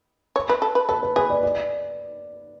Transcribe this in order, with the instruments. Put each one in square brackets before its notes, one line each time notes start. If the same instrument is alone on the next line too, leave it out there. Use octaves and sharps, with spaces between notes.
[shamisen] C#5
B4
A4
B4
[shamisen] A4 [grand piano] B4
[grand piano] B4
[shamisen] G#4 [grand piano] B4
[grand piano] D5
D5